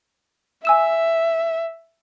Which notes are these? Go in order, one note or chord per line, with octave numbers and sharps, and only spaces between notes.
E5 G#5 E6 E7